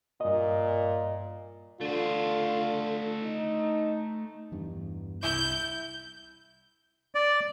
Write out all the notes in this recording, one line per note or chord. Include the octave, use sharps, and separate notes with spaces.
G2 A#2 D#5
D3 A3 F4 C5
D#4
E2 G2
C2 E4 G6
D5